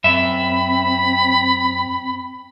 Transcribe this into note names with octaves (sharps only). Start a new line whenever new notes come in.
F#2 C4 E5 B5